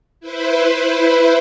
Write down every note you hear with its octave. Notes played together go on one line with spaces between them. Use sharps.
E4 B4 C5